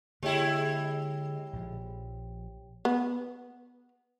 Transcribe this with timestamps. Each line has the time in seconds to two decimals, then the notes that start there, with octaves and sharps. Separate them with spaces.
0.23 D3 G#3 A#3 E4 G4 C#5 G5
1.53 A#1 F3
2.85 B3